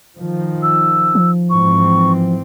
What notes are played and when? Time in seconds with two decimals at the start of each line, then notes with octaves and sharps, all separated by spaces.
0.15 D#3 F3
0.63 E6
1.15 F3
1.50 G#2 E3 C4 C#6